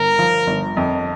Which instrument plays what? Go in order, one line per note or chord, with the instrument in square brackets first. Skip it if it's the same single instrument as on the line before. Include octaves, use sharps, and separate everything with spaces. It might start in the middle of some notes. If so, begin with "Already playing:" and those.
Already playing: [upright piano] G1 [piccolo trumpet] A#4
[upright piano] F3
G1
F2